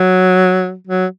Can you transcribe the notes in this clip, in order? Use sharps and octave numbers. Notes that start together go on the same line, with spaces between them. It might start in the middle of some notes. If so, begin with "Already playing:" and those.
Already playing: F#3
F#3